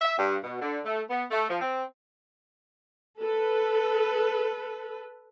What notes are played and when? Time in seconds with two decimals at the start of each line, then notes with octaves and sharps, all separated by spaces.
0.01 E5
0.18 G2
0.44 B2
0.61 D3
0.85 A3
1.10 B3
1.30 A3
1.49 F3
1.61 C4
3.19 A4 B4